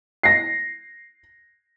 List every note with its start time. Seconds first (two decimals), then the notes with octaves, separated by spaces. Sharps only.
0.23 A#6 C7